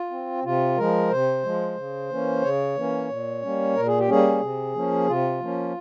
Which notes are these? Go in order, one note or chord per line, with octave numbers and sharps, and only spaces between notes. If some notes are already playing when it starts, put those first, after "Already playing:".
Already playing: F4
C4
C3 F4
F3 G#3 A#4
C3 C5
F3 G#3
C#3
E3 A#3 C#4
C#3 C#5
E3 A#3 C#4
A#2
G3 A#3 C#4
A#2 A#4
G#4
G4
G3 A#3 C#4 G#4
C3
F3 A#3 C#4
C3 F4
F3 A#3 C#4